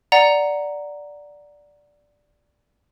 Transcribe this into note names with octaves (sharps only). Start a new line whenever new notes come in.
D5 F#5 A#5